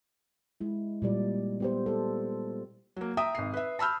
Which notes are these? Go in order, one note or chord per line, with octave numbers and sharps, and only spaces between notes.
G#3 E4
A#2 G3 D5
B3 G4 C5
A4 C5
F#3 A#3
E5 G5 A#5 D#6
G#1 C7
B4 E5
A5 B5 E6 F6 G6